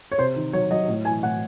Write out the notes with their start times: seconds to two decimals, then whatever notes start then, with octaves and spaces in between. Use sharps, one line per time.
0.12 C#5
0.18 C3 C5
0.36 D#3
0.53 F#3 C#5
0.71 F#3 D#5
0.88 A2
1.05 E3 G#5
1.23 A2 F#5